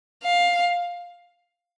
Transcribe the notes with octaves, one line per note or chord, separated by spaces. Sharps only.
F5